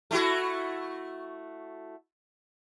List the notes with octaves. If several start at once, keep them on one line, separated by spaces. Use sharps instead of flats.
A3 E4 F#4